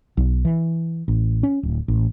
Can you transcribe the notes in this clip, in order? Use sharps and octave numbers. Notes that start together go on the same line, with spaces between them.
B1
E3
A1
C#4
D1
A1